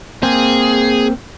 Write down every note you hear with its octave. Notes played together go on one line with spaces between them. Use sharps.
A#3 C4 G#4